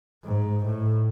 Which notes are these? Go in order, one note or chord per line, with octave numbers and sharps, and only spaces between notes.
G#2
A2